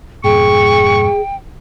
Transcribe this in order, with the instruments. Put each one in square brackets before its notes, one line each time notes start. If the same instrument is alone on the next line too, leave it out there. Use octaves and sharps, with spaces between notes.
[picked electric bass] F2 G#2 B2 [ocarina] G#4 [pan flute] G5 [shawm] C#6